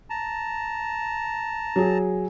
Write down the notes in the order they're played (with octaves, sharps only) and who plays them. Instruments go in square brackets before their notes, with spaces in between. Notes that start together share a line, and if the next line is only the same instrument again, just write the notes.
[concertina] A5 A#5
[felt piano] F#3 G#4